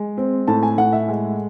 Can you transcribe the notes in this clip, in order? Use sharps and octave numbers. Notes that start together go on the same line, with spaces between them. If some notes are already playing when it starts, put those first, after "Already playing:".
Already playing: G#3
C4
A2 A5
G#5
A2 F#5
E5
G#3